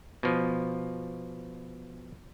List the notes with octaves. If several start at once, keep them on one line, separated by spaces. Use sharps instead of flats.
B2 F3